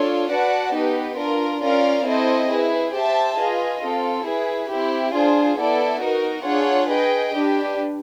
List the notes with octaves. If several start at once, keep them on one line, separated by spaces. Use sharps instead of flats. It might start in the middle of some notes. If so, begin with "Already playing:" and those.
Already playing: D4 F4 A4 C#5
F#4 B4 D5 F#5 A5
B3 D#4 G4 B4
D4 F4 A#4
C#4 F4 A#4 D5 F5
C4 E4 A4 C5 D#5
E4 G#4 B4
G4 C5 E5 A5
F4 G#4 B4 D#5
C4 F4 A4
E4 G#4 B4
C4 E4 G4
D4 F4 G#4 C5
B3 E4 A4 D5
D#4 F#4 A#4
D4 F4 G#4 C#5 F#5
G#4 B4 D#5 G5
D4 G4 B4